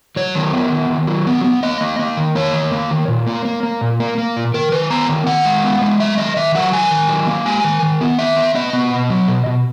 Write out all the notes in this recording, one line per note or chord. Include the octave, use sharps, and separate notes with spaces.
F#3 C#5
D#3
B3
D#3
D#3
F#3
B3
B3
A#3 D#5
A#3
A#3
D#3
A#3 C#5
D#3
A#3
D#3
A#2
A#3
A#3
A#3
A#2
A#3
A#3
A#2
D#3 A#4
D#3 B4
B3 A#5
D#3
D#3 F#5
G#3
B3
G#3
F#3 E5
D#3 D#5
D#3 E5
F#3 F#5
D#3 G#5
D#3
F#3
A#3
G#3 G#5
D#3
D#3
B3
D#3 E5
B3
B3 D#5
B3
B2
F#3
B2
B2